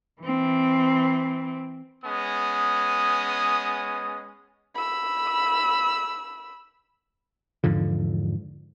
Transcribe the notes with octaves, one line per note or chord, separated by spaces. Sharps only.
E3 C4
G#3 B3 C#4 D#6
B5 E6
E2 G#2 D3 F3